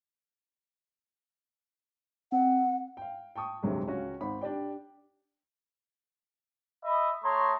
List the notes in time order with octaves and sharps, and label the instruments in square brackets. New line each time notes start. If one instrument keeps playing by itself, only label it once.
[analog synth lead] C4 [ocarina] F#5
[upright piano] F5 G5
G5 A5 C#6 D#6
D2 G2 C3 F#3 G#3
C#2 C#4 F#4 F5
G#1 C5 F#5 B5
D4 G4 D5 G5
[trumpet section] D#5 E5 B5
A3 C#5 A5 A#5 C6 D#6